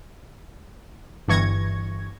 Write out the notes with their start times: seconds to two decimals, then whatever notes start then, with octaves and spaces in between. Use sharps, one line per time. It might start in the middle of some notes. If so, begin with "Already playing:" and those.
1.28 G1 G2 E3 C#6 G#6 A#6